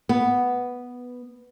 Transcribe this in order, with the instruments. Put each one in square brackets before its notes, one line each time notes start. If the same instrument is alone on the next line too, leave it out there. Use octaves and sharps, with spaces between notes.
[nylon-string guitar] B3